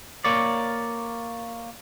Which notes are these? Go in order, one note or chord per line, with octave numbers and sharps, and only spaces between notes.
A#3 C#5 D5